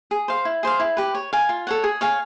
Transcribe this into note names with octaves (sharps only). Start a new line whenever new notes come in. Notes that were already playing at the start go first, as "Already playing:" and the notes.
G#4
C5 F5
E4
G#4 C5 F5
E4
G4 B4
C#5
F5 G#5
F4
A4 C#5 F#5
G#4
C#5 F5 G#5